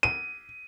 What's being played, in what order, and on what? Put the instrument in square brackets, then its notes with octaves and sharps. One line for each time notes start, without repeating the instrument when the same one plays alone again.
[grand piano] D#7